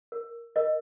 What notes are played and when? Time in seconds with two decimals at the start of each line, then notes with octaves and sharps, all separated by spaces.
0.12 A#4
0.56 A#4 D#5